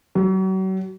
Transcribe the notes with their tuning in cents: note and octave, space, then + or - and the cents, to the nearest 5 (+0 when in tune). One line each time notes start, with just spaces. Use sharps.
F#3 +40